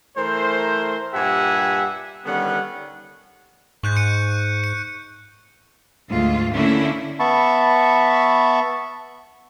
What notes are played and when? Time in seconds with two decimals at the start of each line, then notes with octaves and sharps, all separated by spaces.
0.17 E3 A3 A#4 C5
1.13 G2 A#2 G4 E5 F#5 G#5
2.24 D3 D#3 G3 B3 C#4 F#5
3.83 G#2 C#6 F#6 G6
3.96 F#6 C#7 D#7
4.64 C#7
6.10 D2 G#2 F4
6.54 D3 A3 A#3 C#4 D4 E4
7.20 B3 E5 A5 B5 C#6